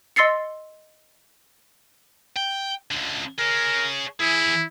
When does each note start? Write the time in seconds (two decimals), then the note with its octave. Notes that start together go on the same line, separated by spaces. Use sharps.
0.16 D#5 C6 E6 A6 C7 C#7
2.36 G5
2.91 C#2 D3
3.39 G#4 A#4 C#5
4.20 E3 E4 G#4